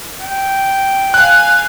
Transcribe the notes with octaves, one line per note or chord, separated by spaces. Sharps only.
G5
F5 G#5 F#6